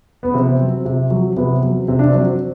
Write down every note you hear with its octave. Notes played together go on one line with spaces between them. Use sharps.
B3
C3 C4
F#3
C3
F#3
C3 B3
F#3
C3 C4
D4
F#3 C4